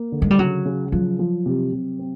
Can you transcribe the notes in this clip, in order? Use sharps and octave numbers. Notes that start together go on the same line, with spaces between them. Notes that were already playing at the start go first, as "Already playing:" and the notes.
Already playing: A#3
D3
G#3
G3
C#3 F#3
C#3
F3 F#3
F3
C3
C3
C4